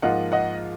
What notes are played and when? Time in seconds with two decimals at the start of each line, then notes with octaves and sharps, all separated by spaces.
0.02 G#2 F3 A#3 F4 D#5 F#5
0.32 D#5 F#5